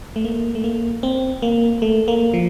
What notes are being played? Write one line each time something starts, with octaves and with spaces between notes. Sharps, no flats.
A3
A#3
A3
A#3
C4
A#3
A3
A#3
F3